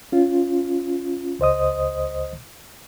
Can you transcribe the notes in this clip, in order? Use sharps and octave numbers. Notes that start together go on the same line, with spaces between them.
C#4 F4
C#2 C5 D#5 D#6